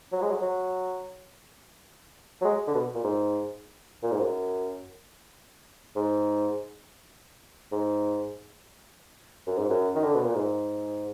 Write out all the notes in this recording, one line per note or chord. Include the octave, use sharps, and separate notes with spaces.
F#3
G#3
F#3
F#3
F#3
G#3
D3
B2
A#2
G#2
A#2
G#2
F#2
G#2
G#2
F#2
G#2
F#2
D#3
D3
B2
A#2
G#2